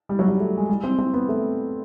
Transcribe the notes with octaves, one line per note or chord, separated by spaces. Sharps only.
G3
F#3
G3
A3
G#3
G3
C4
C4
B3
A3